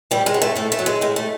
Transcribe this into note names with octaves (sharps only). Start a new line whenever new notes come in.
A2 G3
G#3
F#3
A3
A2 A3
A3
F#3
G#3
A2 G#3
A3